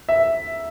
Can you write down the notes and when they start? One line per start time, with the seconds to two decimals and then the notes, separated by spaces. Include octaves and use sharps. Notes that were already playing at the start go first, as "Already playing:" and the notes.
0.09 E5